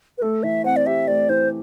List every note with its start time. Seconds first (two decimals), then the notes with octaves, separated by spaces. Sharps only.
0.18 B4
0.22 A3 A4
0.43 E3 E5
0.64 C4 F#5
0.76 D5
0.86 G4 E5
1.08 A3 D5
1.29 E3 C5